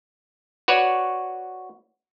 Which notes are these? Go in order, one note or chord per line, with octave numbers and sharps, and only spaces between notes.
F#4 B4 C#5 D5